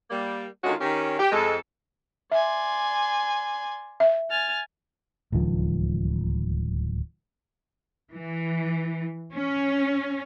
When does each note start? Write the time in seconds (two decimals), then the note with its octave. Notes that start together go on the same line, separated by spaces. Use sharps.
0.11 G3 A#3
0.64 D3 D#3 G#3 C#4 F4 F#4
0.81 D#3 C#4 G4
1.19 G4
1.32 F2 G#3 A4
2.32 D5 E5 G#5 C6
4.00 E5
4.29 G#5 F6 A6
5.32 D1 C#2 D#3 F3
8.11 E3
9.33 C#4